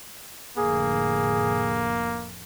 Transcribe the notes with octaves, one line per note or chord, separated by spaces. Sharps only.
F1 A2 D3 A#3 G#4